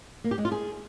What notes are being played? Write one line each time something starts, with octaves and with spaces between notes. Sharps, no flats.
A#3
G4
G#3
F4
G#4